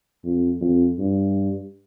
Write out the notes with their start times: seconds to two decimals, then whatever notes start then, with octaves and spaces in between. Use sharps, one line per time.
0.25 F2
0.61 F2
0.99 G2